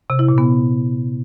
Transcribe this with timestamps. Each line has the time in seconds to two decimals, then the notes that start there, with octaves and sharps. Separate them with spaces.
0.10 C3
0.19 E4
0.28 A#2
0.38 B3